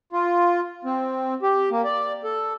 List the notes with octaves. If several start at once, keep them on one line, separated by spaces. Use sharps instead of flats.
F4
C4
G4
A#3
D5
A4